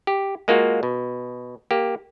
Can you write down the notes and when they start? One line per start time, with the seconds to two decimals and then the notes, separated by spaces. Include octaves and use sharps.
0.07 G4
0.48 G#3 A#3 F4 F#4
0.83 B2
1.71 A#3 G4